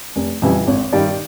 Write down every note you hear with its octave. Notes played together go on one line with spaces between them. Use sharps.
F1
F2 C#3 E3 G3
G#1 C#5
G2 D#3 G3 D5